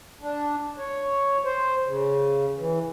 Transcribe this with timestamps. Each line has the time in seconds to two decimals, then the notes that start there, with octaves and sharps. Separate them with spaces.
0.21 D4
0.78 C#5
1.45 C5
1.87 C#3
2.58 E3